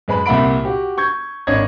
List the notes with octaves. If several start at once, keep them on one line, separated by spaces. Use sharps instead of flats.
F#2 G#3 B4 B5
C2 A#2 E5 F#5 B5 D7
F#4 G4
C#6 G6 G#6
G#1 D4 C#5 D#5 G#6